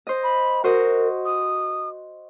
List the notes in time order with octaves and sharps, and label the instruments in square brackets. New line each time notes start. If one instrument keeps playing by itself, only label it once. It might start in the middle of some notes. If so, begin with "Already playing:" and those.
[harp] C5 D#5
[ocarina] B5
[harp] F#4 C5 D#5 [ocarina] A#4
[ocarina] D#6